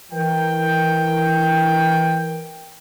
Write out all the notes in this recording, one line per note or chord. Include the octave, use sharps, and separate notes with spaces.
E3 A#4 G5